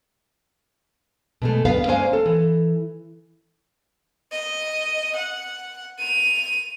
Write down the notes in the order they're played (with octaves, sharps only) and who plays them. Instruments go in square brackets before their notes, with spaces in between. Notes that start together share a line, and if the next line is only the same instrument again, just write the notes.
[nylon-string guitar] B2 G#3 A3
D2 G2 B3 B4 F5
G#3 A#3 C#4 C5 F5 G#5
A4
E3
[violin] D#5
F#5
D#7 F7